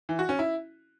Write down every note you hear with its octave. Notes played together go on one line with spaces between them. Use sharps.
E3
F#4
C#4
E4